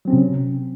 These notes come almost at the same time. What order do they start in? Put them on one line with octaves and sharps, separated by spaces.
F#3 C4 C#4 C3